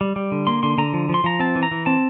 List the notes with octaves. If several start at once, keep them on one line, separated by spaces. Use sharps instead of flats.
G3
G3
D3
A#3 C6
D3 C6
D3 A#5
F3
F3
C6
F3 A#5
C4 A5
E3
A#5
E3
C4 A5